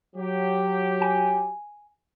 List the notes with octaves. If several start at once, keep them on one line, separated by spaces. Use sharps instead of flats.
F#3 G4
G#5